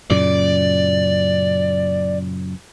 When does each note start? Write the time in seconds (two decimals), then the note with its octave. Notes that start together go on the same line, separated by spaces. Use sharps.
0.10 F#2 A#2 C#3 D5